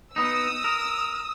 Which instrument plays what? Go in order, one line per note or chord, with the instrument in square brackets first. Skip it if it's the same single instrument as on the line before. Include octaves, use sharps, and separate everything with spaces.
[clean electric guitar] B3 D#4 [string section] D#6 E6
[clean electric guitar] A#4